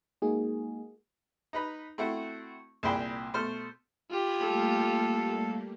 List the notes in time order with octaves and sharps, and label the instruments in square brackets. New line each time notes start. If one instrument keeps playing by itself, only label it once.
[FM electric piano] G#3 A#3 D#4 F#4 G#4
[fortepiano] D#4 B4 B5
A3 C4 E4 F#4
C2 A#2 G#4 C5 G5 B5
B2 A3 C5 F6
[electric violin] F4 G4 [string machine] B5 D#6 G#6
[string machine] G3 A3 A#3 [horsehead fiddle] A4 F5